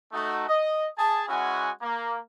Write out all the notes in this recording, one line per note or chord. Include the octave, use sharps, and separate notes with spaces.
A3 D#4 F#4
D#5
G#4 A5
G#3 C#4 E4 F#4 F#5 G#5
A#3